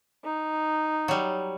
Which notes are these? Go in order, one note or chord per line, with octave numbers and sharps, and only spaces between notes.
D#4
F#3 G3